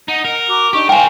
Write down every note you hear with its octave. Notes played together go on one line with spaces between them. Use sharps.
D#4 F#5
A#4
F#4 A#5 D6
D4 D#4 G4 C#6
A#4 C5 F5 G5 G#5